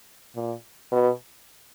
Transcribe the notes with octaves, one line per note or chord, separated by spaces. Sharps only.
A#2
B2